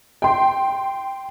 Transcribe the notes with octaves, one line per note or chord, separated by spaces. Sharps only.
G5 C6